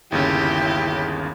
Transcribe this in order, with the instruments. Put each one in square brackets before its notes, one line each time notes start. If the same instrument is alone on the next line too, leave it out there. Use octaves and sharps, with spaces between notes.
[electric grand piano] G1 D#2 C#3 [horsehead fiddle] E4 [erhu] G4